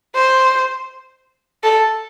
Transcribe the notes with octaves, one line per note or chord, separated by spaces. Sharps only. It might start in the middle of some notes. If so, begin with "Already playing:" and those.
C5
A4